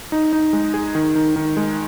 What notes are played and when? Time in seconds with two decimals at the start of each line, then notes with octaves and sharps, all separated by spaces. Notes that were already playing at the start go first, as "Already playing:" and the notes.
0.12 D#4
0.33 D#4
0.53 G#3
0.74 G#4
0.95 D#3
1.15 D#3
1.36 D#3
1.57 G#3